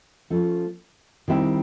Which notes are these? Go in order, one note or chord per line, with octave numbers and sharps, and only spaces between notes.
F3 A3 C#4
D#3 G3 C4 E4 G4